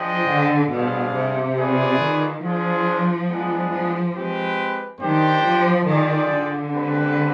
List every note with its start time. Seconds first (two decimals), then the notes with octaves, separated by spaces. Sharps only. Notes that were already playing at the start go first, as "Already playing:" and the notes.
Already playing: F3 D4 G#4 C5 D#5 G5
0.29 D3
0.72 B2 G3 D4 G#4 C5 F5
1.15 C3
1.58 F4 G#4 B4 D5
2.01 D#3
2.43 F3 D4 F4 G#4 C5
3.29 G#3 B3 D4 G#4
3.72 F3
4.15 G#3 C4 G4 B4
5.01 D#3 D4 G4 C5 G5
5.44 F3
5.87 D#3 F4 G#4 D5 G5
6.30 D3
6.73 G#3 C4 G4 B4